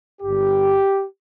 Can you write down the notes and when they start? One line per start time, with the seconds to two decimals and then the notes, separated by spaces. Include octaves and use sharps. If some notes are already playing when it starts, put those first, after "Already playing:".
0.21 G1 G2 G3 G4